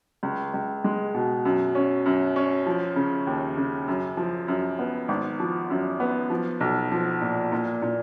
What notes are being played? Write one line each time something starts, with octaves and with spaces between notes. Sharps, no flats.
C#2
C#2
G#3
B2
F#2
C#4
F#2
C#4
F3
C#3
D#2
C#3
F#2
F3
F#2
B3
G#1
F3
F#2
B3
F3
B1
F3
A#2
A#2
A#2